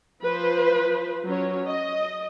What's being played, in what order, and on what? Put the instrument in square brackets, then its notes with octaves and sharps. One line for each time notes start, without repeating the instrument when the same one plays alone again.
[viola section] F3 B4 C5
F#3 C#4 C#5
D#5